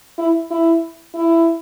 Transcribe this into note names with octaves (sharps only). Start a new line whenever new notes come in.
E4
E4
E4